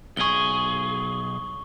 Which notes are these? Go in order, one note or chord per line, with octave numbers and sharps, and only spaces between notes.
B1 G#4 C#6 G7